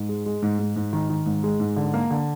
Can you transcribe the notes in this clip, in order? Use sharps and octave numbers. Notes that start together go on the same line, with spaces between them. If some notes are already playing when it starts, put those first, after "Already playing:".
Already playing: G#2
G#3
G#3
G#2
G#2
G#2
D#3
D#3
G#2
G#3
G#2
D3
A#3
D3